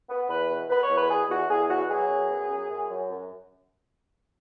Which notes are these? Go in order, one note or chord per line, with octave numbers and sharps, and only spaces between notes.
B3
E2 B4
B2
B2 B4
C#5
E2
B4
B2 G#4
E2 F#4
E2 G#4
B2 F#4
F#3 G#4
F#2
B3
F#2
F#2
F#2
F#2